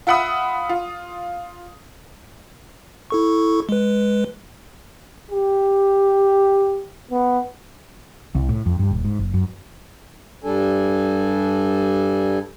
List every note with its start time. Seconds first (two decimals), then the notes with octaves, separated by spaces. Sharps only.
0.07 F4 E5 F#5 B5 D#6
0.69 F4
3.10 E4 A4 C#6
3.69 G#3 B4
5.31 G4
7.11 B3
8.35 C2
8.49 A2
8.66 F2
8.79 G2
8.91 D#1
9.05 G#2
9.19 F#1
9.34 F#2
10.44 G2 G3 D4 A4 G#5